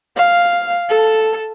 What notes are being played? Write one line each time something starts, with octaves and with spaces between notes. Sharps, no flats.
F5
A4